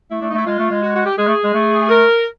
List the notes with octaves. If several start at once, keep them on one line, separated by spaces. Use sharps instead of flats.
A3 E4
A3 D4
D#4
A3
E4
G#3 F4
A3
G#3
F#4
F#4
G4
G#3 G#4
A3
G#3
A3
A#4